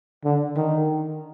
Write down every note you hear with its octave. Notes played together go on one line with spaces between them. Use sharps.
D3
D#3